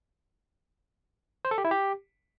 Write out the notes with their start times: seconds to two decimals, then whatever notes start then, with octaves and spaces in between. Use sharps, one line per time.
1.45 C5
1.51 A4
1.58 G4
1.65 E4
1.71 G4